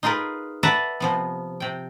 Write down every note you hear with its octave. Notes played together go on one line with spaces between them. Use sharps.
D#4 F4 G#4 A#4 B4
B4 D5 E5 F#5 A5 A#5
C3 F3 B3
C3 G5